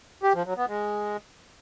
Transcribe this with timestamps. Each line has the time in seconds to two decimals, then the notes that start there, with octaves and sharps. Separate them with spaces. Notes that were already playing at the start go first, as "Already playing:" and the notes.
0.23 G4
0.34 F3
0.46 F#3
0.57 B3
0.68 G#3